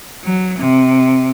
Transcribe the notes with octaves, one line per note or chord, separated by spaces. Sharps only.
F#3
C3